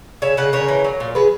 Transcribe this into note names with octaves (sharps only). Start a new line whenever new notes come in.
C#3 C#5 E5
C#3 D#5 F#5
C#3 A#4 C#5
E3
F#3
A#2
F#3 G#4 B4